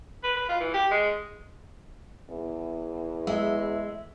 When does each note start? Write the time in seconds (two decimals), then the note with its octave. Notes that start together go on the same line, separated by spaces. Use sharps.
0.23 B4
0.37 B4
0.49 F4
0.60 E3
0.74 G4
0.91 G#3
2.29 E2
3.27 G#3 E5